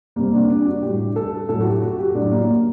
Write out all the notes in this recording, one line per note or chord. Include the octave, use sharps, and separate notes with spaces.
C3 G3 A#3
D4
D4
F#4
A2 G3 G4
A4
A2 F#3 A4
F#4
G4
F#4
G4
A2 F#3 D4
A#3